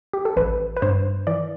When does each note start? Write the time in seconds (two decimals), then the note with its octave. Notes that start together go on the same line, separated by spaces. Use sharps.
0.13 G4
0.25 A4
0.37 A1 B4
0.77 B4
0.82 G2 C5
1.27 E3 D5